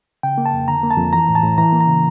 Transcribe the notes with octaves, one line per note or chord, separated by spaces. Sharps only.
C#3 G5
A#3
A5
F2
D3 A#5
A#3
A5
F2
E3 A#5
A2
A5
A2
E3 A#5
A#3
A#5
C#3